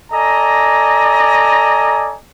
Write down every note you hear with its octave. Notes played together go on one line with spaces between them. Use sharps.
A4 D5 D#5 G#5 A#5